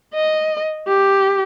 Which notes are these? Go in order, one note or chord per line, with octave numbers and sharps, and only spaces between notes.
D#5
G4